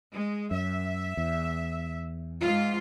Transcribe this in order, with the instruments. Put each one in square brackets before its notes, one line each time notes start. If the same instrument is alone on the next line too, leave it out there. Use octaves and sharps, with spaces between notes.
[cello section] G#3
[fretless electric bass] F#2 [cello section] E5
[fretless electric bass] E2
[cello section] G#2 F4